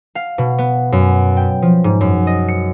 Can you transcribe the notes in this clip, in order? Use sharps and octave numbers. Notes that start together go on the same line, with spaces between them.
F5
B2
B3
F#2
G5
F3
G#2
F#2
D#5
C#7